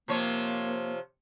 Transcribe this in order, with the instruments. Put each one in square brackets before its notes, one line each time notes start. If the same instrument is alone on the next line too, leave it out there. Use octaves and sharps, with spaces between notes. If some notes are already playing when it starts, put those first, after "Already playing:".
[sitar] C3 F3 C#5 [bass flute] A#3